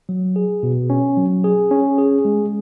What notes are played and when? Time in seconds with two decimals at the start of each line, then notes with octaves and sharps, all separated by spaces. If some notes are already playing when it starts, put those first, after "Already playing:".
0.09 F#3
0.36 G#4
0.63 B2
0.90 C#4
1.17 F#3
1.44 G#4
1.71 C#4
1.98 G#4
2.25 G#3